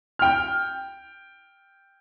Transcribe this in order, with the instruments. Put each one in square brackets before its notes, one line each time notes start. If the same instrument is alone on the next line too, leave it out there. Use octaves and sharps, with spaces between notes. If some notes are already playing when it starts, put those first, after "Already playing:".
[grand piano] G5 F6